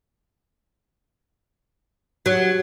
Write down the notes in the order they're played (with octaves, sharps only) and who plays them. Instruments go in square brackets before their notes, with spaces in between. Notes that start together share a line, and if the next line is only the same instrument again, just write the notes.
[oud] F#3